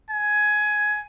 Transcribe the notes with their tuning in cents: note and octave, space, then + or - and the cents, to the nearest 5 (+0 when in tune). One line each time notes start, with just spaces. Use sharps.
G#5 +15